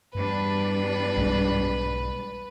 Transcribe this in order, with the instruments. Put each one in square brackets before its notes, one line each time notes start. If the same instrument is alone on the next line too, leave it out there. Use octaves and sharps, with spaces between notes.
[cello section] E2 G3 D4 [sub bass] G2 [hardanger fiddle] B4
[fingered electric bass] B1 G#2 G#3